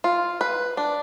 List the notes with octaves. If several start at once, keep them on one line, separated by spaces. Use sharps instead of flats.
F4
B4
D4